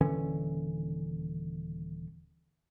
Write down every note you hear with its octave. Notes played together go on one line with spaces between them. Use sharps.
D#1 D3 E3 C#4